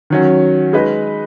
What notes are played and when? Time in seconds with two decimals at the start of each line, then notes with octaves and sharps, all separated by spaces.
0.10 D#3 F#3 C#4
0.73 G#3 D#4 B4 D#5